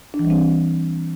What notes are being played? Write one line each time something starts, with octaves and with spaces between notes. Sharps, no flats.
D4
E3
G3
C4